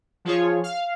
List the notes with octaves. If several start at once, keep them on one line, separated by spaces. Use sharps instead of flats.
F3 F4 G#4 C#5
F5